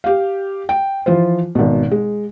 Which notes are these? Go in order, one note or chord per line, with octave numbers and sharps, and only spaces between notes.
G4 F5
G5
E3 F3 F4 C5
G#1 B2
G#3